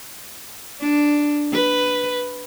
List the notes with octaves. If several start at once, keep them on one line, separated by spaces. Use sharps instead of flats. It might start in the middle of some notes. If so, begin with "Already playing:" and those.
D4
B4